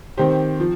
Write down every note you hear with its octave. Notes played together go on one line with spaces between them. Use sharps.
D#3 C4 G4 C5
F3